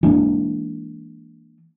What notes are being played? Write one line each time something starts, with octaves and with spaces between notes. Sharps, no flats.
E3 G#3 A#3 D4